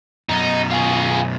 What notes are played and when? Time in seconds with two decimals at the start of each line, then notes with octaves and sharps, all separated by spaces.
0.29 F#2 B2 D#4
0.71 F4 G#4